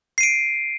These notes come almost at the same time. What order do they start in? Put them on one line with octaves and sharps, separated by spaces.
C7 D#7 D7